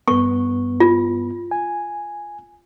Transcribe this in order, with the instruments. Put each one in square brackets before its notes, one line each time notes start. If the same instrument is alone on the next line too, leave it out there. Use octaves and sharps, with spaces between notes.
[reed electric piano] G2 B3 [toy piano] C#6
[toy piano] F4
[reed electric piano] G#5